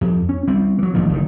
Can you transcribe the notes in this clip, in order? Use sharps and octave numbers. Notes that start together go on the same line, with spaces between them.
F2
C#4
G3 C4
E3 F#3
A1 A2 D#3 F3
F#1 A2 D#3